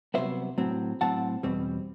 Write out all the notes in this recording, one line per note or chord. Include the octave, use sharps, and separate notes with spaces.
C2 C3 D#3 F#3 B3 C5 E5
A2 F#3 C4
A2 F#3 C4 F#5 A5
E2 B2 G3 C4